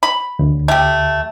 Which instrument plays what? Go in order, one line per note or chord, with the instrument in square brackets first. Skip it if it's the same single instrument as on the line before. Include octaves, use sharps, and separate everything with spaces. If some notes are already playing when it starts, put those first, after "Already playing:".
[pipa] B5
[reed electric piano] D2
[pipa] A3 G4